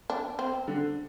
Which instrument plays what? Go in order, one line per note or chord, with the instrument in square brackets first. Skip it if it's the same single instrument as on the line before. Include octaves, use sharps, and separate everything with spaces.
[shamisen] D4
C4
[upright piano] D3